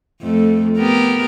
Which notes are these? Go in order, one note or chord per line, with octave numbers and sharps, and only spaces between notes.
F2 A3
B3 G4 A#4